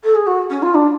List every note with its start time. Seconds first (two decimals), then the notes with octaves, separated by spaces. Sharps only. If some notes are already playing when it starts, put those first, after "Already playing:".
0.04 A4
0.15 G#4
0.26 F#4
0.50 C#4
0.62 F4
0.74 D4